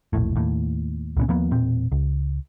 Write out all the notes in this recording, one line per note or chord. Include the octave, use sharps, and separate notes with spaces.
E1 A#1 A2
D#2 A2
C#2 A#2 B3 C#4
D#2 F3 A#3 B3
E1 A#2 C4
C#2